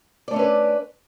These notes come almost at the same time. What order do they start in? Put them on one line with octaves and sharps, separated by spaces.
D5 A3 D4 C#4 B4